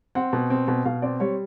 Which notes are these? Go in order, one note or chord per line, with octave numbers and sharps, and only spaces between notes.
C4 F#5
B2
C4
B2
B2 F5
C4 D5
G3 C#5